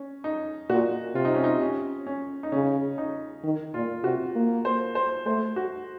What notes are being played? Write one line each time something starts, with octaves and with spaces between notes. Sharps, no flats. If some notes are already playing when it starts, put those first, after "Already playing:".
Already playing: C#4
D#4
A#2 F#4
C3 F4
D#4
C#4
D#4
C#4
C#4
D#4
C#3 C#4
D#4
D#3
A#2 F4
C3 F#4
A#3
C5
C5
A3 C5
F#4